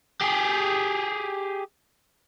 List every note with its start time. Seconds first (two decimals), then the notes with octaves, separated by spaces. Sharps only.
0.21 G4 G#4